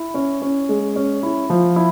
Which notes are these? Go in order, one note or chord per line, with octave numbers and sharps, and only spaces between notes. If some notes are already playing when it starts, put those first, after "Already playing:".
Already playing: E4
C#4
C#4
G#3
C#4
E4
F3
E4